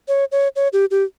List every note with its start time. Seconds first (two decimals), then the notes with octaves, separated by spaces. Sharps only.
0.08 C#5
0.32 C#5
0.56 C#5
0.73 G4
0.91 G4